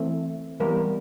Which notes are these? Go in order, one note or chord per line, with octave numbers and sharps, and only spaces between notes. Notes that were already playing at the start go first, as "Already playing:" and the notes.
Already playing: E3 A3 C4
E3 G3 B3 A#4